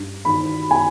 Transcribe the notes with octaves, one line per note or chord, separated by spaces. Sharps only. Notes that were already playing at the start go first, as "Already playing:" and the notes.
Already playing: G2
D#3 B5
G#5